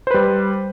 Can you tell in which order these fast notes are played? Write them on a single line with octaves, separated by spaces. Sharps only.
C5 B4 G3